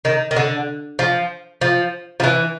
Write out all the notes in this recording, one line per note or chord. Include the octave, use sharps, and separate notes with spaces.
D#3
D#3
D3
F3
F3
F3
E3